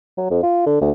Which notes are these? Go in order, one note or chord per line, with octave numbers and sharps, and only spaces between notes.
F#3
F2
F4
D3
D2